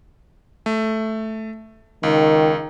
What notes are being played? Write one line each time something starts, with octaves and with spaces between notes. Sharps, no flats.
A3
C#2 D#3